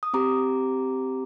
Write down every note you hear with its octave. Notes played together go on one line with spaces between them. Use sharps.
D#6
C4 G4 A#5 D6